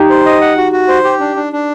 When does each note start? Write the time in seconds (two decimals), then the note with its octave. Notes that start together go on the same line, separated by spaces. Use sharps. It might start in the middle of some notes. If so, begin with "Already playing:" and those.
Already playing: D#4 G4
0.10 C5
0.25 D#5
0.41 F#5
0.57 F#4
0.72 F#4
0.88 C5
1.04 G4
1.20 D4
1.36 D4
1.53 D4